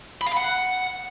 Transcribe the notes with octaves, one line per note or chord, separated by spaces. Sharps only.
B5
F5
B5
F#5